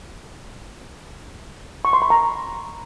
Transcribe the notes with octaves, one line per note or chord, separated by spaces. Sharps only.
C#6
C6
B5
A#5